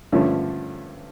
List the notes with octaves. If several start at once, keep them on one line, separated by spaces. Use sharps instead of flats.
G2 D3 F3 A3 C#4